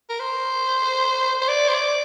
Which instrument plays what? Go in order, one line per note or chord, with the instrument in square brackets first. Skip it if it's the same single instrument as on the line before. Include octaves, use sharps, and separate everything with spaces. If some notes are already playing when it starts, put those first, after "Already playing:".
[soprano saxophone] A#4
C5
C5
D5
C5
D5